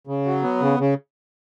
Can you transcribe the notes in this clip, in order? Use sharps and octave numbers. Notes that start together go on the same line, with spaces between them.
C#3
F#3
B3
C#3
C#3